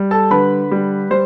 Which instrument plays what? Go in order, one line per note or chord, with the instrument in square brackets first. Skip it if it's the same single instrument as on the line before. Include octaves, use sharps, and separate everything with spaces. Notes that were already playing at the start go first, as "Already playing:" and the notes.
Already playing: [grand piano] G3
A4 A5
D3 B4 B5
G3
G3 C5